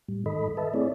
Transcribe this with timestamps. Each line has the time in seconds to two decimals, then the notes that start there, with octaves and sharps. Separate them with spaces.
0.08 A2 G3
0.26 G#2 D#3 A4 D#5 B5
0.57 B4 D#5 E5 A5
0.74 A3 C4 E4 G#4 C#5 D5